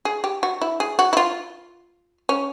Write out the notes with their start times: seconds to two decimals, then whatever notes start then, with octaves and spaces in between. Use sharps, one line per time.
0.05 G#4
0.24 G4
0.43 F#4
0.62 E4
0.80 G#4
0.99 F#4
1.13 E4
1.17 F4
2.29 C#4